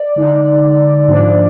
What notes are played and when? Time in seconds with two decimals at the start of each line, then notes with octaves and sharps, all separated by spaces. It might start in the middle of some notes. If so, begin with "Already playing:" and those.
Already playing: D5
0.16 D3 G#3 D#4
1.08 G#2 F3 A#3 D4